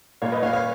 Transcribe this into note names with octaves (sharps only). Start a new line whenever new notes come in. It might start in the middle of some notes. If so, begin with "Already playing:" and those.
A#2 C#5 F5
B4 D#5
A#2 C#5 F5
C#5 F5